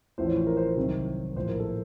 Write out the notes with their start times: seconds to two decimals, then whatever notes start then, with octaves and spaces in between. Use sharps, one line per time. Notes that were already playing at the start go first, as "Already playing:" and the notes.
0.18 A1 A2 F3 C5
0.28 C#5
0.37 C5
0.47 A#4
0.57 C5
0.68 C5
0.76 C2 C3 D#3 F#3
1.36 A#1 A2 F3 C5
1.49 A#4
1.60 A4